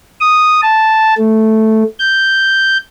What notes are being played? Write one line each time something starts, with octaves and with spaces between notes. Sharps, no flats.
D#6
A5
A3
G6